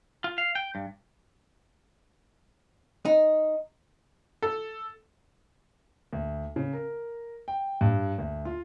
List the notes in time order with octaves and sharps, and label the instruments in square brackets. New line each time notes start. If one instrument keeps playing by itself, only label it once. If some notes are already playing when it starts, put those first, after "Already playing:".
[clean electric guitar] F4
F5
G5
G2
[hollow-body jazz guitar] D#4
[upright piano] A4
[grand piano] D2
C#3
A#4
G5
G2
D2
F4